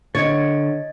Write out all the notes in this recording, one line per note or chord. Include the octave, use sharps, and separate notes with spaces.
D3 C#5 D#5 G#6 A6